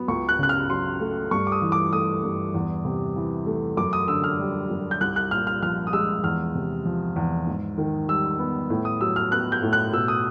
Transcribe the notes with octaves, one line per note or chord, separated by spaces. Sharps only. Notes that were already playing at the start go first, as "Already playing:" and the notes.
Already playing: F#3 B3
C#2 C#6
F#6
C#3 F#6
F6
F#3 C6
A3
G2 C#6
D6
D#6
E3
D6
A3 D#6
G2
E2
C3
E3
A3
F#2 D6
D#6
D3 E6
F6
G3
F#2
G6
C2 F#6
F#6
A#2 F6
F6
F3 F6
D#6
G#3 E6
E2 F6
C3
F3
E2
G#2
D#3
G3 E6
B3
A2
D#6
F#3 E6
F6
B3 F#6
G6
A2
F#6
B2 E6
D#6